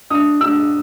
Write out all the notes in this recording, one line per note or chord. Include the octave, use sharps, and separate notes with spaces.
D4 D#6
D4 E6